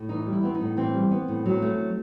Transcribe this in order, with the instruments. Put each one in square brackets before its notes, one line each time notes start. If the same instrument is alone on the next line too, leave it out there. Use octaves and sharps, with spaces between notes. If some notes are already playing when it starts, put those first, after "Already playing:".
Already playing: [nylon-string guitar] A2
E3 D#4
G3
E4
B3 C4
D#4
A2
E3 C4
G3
B3
A2
F#3
A3